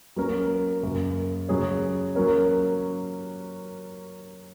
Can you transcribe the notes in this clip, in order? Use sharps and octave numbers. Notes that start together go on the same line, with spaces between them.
F#3 A#3 C#4 A#4
F#2 C#3 A#3
C#3 F#3 C#4 G#4 C#5
F#3 A#3 C#4 A#4 C#5